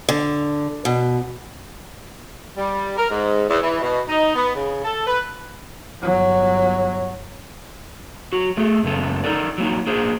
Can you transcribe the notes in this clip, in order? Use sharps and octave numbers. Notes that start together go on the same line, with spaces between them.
D3
B2
G3
A#4
G#2
E2
E3
B2
D#4
B3
C#3
A4
B4
G1 F#3
F#3 F#4
A3 G#4 A4
F#2 C#3 B3 A4
D#4 F4 A4 A#4 D5
F#3 A#3 D#4
A#3 D4 G#4 C5